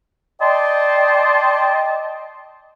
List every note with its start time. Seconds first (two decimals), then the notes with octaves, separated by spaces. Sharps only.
0.41 D5 D#5 G5 A5 C6